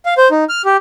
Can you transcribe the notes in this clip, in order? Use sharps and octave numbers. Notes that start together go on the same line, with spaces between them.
F5
C5
D#4
F6
G4